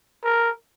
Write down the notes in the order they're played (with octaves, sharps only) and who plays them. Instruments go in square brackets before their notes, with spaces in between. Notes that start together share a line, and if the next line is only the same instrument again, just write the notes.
[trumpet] A#4